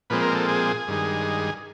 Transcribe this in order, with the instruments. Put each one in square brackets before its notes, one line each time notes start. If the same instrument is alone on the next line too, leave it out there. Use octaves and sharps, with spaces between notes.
[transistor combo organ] A#2 F3 G#3 C4 B4
A#4
A4
G#4
G2 D#3 G#3